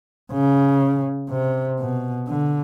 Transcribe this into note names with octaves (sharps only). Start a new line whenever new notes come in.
C#3
C3
B2
D3